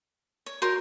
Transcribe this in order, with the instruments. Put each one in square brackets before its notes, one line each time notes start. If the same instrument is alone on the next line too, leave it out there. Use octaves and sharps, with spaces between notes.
[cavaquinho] C#5
[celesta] F#4 G6 [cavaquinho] A#4 C#5 C6